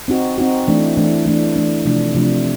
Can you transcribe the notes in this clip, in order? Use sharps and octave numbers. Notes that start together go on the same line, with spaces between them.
C4 D#4 F#4
C4 D#4 F#4
E3 A3 D4
E3 A3 D4
E3 A3 D4
E3 A3 D4
C3 F3 A3 D4
C3 F3 A3 D4